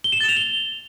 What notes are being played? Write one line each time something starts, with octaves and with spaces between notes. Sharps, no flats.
G7
E7
A6
F7
G7